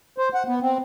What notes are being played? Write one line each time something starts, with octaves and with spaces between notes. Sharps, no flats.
C5
F#5
B3
C4